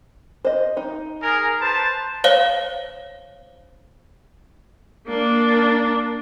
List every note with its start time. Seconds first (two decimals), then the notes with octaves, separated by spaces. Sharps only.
0.45 C5 D#5
0.77 D#4
1.23 G#4 A#4
1.61 B4 C5 A5
2.24 C5 C#5 F5 G7
5.08 A#3 D4